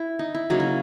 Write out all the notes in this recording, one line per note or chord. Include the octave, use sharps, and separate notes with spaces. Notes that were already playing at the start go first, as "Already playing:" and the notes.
Already playing: E4
D#4
E4
C#3 F#3 A#3 D#4
E4